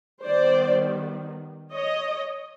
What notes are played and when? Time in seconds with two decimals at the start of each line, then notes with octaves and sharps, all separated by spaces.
0.24 D#3 G3 B3 C5 D5
1.73 C#5 D#5